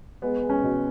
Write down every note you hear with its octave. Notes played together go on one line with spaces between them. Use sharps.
G#3 B3
G#3
C#4
B2